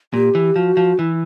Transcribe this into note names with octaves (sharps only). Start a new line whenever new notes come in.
A#2 G4
E3
F3 F#4
F3
E3 E4